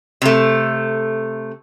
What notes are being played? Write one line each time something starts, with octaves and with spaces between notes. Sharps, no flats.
C3 A3